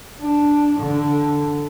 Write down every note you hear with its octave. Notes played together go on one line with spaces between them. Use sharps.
D4
D3